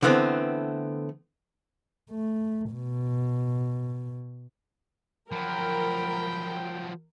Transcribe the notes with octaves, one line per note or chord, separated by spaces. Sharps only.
D3 E3 A3 B3 C4
A3
B2
F3 F#3 A#4 G5 B5